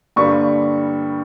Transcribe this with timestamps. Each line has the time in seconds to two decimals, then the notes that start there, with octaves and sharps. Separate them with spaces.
0.16 G2 D3 G3 A#3 C#6